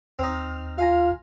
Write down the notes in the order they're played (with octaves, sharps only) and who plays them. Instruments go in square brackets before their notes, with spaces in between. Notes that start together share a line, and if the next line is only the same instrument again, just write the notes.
[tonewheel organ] D#2 F6 [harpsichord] C4 D#4
[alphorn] F4 [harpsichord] F5 G#5 A#5